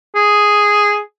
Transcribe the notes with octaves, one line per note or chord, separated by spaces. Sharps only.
G#4